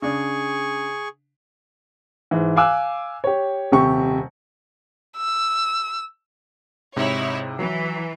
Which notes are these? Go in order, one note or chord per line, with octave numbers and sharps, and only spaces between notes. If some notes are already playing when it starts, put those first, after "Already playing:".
C#3 D4 G#4 C#6
G#2 E3
F5 G#5 D6 E6 F#6
G4 C#5
D#1 C3 G4 C#6
E6
G#2 C3 D#4 E4 C#5
E3 F#3